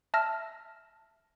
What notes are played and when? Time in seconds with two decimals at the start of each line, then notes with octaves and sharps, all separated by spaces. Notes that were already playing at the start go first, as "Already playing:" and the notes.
0.14 E5 A5 E6 F6 A#6